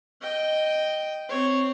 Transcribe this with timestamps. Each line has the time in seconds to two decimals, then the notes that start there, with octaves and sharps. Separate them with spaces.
0.22 D#5 G5
1.29 C4 C#5